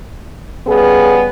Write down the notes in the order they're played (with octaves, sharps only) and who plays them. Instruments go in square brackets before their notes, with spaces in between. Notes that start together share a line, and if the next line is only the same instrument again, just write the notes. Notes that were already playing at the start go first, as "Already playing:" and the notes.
[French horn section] C#3 G3 B3 G#4